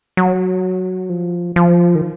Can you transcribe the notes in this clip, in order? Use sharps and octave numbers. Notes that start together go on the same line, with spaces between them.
F#3
F3
F3
D#3